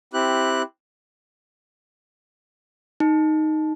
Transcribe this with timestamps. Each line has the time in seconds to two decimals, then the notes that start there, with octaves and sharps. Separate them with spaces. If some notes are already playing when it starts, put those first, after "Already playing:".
0.14 C4 E4 G4 F#6
3.00 D#4